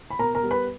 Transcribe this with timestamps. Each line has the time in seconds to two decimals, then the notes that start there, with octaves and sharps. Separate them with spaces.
0.10 B5
0.19 B2 A#4 A#5
0.35 A#4 A#5
0.43 G3 B3
0.51 B4 B5